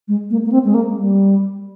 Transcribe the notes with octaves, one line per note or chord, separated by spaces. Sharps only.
G#3
A#3
A#3
C4
G#3
A#3
G3